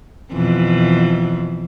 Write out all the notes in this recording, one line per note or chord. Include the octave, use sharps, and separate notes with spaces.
F2 B2 E3